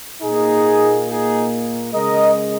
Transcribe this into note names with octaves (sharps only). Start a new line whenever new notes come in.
A#2 A#3 D#4 G#4
D#4 G#4
C#3 G#3 A#4 D#5